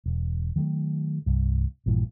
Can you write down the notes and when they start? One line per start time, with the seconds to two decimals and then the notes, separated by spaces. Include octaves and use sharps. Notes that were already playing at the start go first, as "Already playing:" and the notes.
0.06 E1
0.56 D#3 F#3 G3 A3
1.26 C2 G2
1.86 A#1 G2 A#2 E3